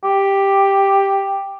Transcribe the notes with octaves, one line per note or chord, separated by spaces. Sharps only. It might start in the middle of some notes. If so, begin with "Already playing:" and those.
G4